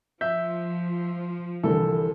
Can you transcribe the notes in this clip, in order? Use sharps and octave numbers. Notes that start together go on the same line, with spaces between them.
F3 E5 G6
C2 D3 E3 A4